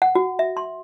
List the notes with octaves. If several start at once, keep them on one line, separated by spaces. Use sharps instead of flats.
F#5
F#4
E5
C6